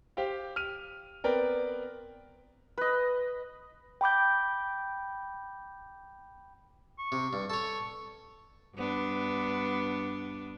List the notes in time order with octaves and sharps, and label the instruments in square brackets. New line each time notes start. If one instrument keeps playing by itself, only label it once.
[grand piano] G4 C5 F5 G5
F6 D#7
B3 C4 A#4 B4 D5 G5
[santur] B4 D#5
[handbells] G5 B5 D6 G6
[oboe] C#6
[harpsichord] C3
G2
[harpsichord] A4 C#5 [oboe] C#6
[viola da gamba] G2 B3 D4